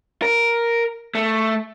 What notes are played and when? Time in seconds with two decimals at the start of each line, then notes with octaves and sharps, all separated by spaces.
0.22 A#4
1.15 A3